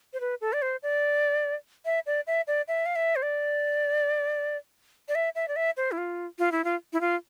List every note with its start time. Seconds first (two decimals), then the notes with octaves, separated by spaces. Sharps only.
0.13 C5
0.20 B4
0.41 A4
0.53 D5
0.62 C5
0.83 D5
1.85 E5
2.06 D5
2.27 E5
2.47 D5
2.68 E5
2.86 F5
2.95 E5
3.16 C5
3.22 D5
5.08 D5
5.15 E5
5.35 E5
5.48 D5
5.56 E5
5.77 C5
5.91 E4
5.98 F4
6.39 F4
6.52 E4
6.64 F4
6.93 E4
7.01 F4